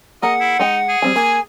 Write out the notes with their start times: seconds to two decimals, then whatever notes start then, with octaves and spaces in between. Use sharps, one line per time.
0.22 A#3 G#4 D#5 F#5 A#5
0.40 E4
0.60 G#3 D#4 D#5 G5
0.89 G#4
1.02 G3 C4 G#5
1.16 A#3 G#5